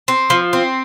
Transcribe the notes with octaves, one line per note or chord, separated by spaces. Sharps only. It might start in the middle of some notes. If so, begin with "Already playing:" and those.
C4
F3
C4